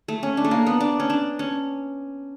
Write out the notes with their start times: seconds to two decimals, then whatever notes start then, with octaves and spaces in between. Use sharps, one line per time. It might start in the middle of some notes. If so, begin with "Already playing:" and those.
0.08 A3
0.23 C#4
0.37 D4
0.44 A3
0.51 A#3
0.67 B3
0.80 D4
1.00 C#4
1.10 D4
1.39 C#4